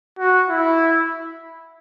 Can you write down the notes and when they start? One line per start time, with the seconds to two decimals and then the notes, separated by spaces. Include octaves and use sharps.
0.19 F#4
0.49 E4